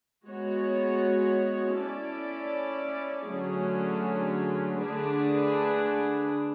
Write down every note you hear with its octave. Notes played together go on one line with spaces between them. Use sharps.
G#3 B3 F#4 C#5
C#4 E4 A4 D5
D3 F#3 A3 C#4 G#4
D3 A3 D4 G#4 B4